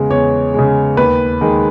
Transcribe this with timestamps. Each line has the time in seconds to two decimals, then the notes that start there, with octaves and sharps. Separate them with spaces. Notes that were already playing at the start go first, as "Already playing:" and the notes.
Already playing: E2 C#3 G#3
0.10 E2 C#5
0.54 C#3 G#3
0.97 D#2 B4
1.41 D#3 G#3